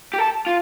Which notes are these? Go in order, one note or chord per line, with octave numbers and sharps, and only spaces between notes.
G4
A4
F4